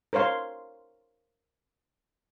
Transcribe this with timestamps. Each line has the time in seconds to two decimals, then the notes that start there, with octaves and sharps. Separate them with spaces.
0.13 A#4 C5 C#5 F5 C6